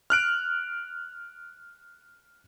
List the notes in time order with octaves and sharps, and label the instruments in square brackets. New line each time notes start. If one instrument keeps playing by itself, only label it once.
[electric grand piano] F6 F#6 D7